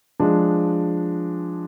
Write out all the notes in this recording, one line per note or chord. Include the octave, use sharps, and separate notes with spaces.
F3 G#3 D4